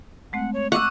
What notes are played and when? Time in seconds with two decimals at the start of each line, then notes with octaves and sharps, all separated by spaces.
0.33 G#3 A3 C4 F#5
0.53 C#5
0.72 F#5 C#6 D6 E6 F#6